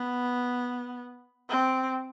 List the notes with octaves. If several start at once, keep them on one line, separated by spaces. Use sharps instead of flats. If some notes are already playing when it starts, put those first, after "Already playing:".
Already playing: B3
C4